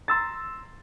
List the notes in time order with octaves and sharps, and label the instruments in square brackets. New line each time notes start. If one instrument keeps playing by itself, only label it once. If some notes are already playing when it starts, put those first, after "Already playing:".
[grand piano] A#5 C6 E6 A6